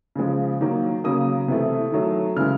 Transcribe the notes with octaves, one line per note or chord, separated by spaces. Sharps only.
C#3 F3 G#3
D#3 F#3 A#3
C#3 F#3 A#3 D#6
C3 E3 A3
D#3 F#3 A3
C#3 E3 G#3 F6